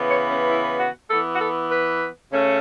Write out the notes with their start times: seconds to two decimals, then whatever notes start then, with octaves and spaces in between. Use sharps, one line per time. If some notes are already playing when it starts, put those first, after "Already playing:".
Already playing: C#3 E3 B3
0.09 C#5
0.30 C#4
0.49 E4
0.80 F#4
1.10 E3 B3 A4
1.34 F#4
1.40 A4
1.70 B4
2.31 C#3 A3 C#4